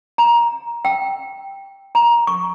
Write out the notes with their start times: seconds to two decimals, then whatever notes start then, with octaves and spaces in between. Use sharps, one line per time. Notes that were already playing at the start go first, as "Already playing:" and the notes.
0.18 A#5
0.85 G5
1.95 A#5
2.27 C#6